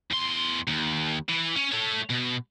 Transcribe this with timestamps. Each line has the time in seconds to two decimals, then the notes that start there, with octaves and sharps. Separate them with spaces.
0.11 E2 C6
0.68 D#2
1.29 E3
1.56 C#4
1.72 A3 C#5
2.10 B2